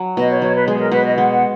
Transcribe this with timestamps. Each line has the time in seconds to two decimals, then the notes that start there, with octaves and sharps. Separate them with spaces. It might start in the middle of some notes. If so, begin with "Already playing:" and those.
Already playing: F#3
0.17 B2 D#5
0.30 C#5
0.42 F#3 C#5
0.54 B4
0.67 G#3 G#4
0.79 A#4
0.91 B2 B4
1.04 D#5
1.17 G#3 F#5